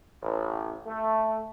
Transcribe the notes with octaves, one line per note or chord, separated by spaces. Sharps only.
A1
A3